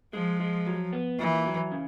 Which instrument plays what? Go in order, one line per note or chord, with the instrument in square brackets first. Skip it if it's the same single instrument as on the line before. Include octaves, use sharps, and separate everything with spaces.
[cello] F3 [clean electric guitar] G#3
[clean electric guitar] G#3
F#3
B3
[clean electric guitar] A#2 [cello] E3
[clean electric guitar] F#3
C#3